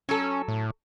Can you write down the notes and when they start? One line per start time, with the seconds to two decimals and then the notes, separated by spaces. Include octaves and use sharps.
0.09 F#3 C#4 A4
0.48 A2